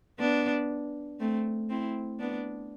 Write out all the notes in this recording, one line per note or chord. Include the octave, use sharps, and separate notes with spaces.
B3 D4
A3 C4
C4 E4
B3 D4